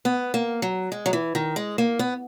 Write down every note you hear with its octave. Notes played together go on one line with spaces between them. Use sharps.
B3
A#3
F#3
G#3
F#3
E3
D#3
G#3
A#3
B3